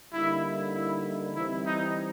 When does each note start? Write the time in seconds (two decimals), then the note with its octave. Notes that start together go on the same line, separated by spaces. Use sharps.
0.12 D3 G3 A#3 D#4 E4
0.74 E4
1.35 E3 G3 C4 E4
1.66 D#4